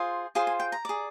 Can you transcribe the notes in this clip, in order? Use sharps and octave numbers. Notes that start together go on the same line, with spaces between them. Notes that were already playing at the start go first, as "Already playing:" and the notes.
Already playing: F4 G#4 C5
F4 G#4 C5 C6
G#5
G5
A#5
G#4 D5